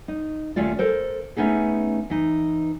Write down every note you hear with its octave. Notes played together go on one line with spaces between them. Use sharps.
D#4
D#2 A3 C#4 F4 D5
A4 A#4 C5
A3 B3 C#4 D#4 G#4
E3 D#4